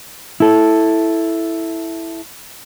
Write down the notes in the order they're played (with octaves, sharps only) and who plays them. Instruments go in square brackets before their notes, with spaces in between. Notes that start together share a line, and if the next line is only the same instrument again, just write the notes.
[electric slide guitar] E4 A4